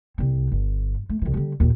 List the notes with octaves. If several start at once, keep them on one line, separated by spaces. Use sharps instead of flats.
C2 C4
G1
A3
C2 E3
D3 G3
D#2 A#2